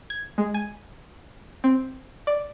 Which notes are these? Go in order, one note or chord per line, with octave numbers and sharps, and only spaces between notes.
G#6
G#3
G#5
C4
D5